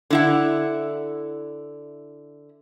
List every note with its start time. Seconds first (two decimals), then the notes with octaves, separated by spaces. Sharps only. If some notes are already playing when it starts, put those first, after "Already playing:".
0.10 D3 E4 F#5